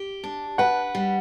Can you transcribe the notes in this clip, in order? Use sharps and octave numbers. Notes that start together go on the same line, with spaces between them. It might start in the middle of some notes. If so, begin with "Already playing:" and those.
Already playing: G4
D4
B4 F#5
G3